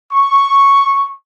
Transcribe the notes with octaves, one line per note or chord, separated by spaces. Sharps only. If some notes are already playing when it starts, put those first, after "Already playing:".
C#6